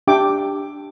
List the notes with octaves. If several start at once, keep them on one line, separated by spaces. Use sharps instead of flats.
D4 G4 E5 G5 D6